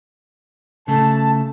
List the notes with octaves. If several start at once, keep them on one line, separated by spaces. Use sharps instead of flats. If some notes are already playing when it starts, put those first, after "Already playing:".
C#3 A3 A5